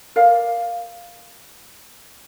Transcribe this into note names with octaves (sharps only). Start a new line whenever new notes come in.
A#4 D5 F5